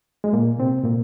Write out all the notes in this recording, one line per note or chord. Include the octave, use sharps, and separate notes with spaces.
G#3
A#2 A#3
C3 C4
A#2 A#3